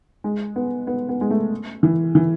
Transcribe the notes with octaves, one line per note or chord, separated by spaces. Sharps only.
G#3
B3
B3
B3
G#3
A3
E3
E3